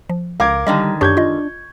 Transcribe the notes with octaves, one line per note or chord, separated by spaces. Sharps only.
F3
C#2 A#4 F5 D6 G#6
G#2 D3 D#3 G3 D#5 A5
F#2 D4 G4 C#5 C#6 G6 G#6
F4 D#5